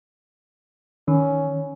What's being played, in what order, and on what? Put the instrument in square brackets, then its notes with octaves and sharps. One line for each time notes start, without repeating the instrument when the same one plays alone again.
[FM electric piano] D#3 [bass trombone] C#4